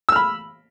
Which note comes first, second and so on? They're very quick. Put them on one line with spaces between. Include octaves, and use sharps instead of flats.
E6 F6 B5